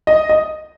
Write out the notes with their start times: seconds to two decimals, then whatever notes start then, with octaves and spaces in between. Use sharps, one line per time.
0.07 D#5
0.29 D#5